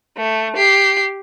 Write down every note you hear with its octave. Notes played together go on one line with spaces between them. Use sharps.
A3
G4 C7